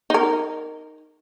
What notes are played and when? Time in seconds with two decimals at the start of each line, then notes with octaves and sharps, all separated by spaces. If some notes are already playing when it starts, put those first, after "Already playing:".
0.10 D#4 A#4